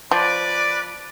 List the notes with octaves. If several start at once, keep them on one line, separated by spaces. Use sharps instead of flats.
F3 B4 D5